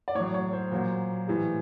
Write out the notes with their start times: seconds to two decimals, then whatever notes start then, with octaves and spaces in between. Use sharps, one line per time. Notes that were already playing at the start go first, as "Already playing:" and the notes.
0.08 D5
0.15 A2 C#5
0.20 F#3
0.34 C#5
0.53 C5
0.71 A#2 F#3 C5
1.28 A2 E3 G3